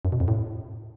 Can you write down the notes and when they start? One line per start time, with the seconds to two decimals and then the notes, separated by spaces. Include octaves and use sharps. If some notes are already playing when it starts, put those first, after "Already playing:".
0.05 F#2
0.12 B2
0.20 F2
0.28 A2